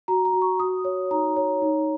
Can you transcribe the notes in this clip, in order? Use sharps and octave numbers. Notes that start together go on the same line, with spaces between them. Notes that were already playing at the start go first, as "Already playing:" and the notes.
F#4 A#5
A#5
F#4
C#6
F#4 D#6
C#5
D#4 A#5
C#5
D#4